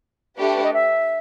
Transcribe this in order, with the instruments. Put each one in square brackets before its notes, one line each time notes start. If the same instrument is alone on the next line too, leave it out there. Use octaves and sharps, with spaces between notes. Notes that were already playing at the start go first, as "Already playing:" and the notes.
[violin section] A3 D4 G4 B4
[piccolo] D#5
E5